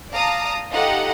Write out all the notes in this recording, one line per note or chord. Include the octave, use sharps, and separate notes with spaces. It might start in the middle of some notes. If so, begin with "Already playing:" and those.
D5 F5 A5 A#5 D#6
D#4 F4 G4 A4 D#5 F#5